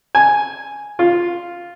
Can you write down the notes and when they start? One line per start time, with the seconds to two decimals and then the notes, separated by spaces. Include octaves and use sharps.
0.15 G#5
0.99 F4